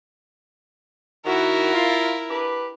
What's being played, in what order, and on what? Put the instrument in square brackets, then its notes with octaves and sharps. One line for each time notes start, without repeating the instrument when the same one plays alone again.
[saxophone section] D#3 F#4 [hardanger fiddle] E4 A#4
[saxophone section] F4
D4 G4 B4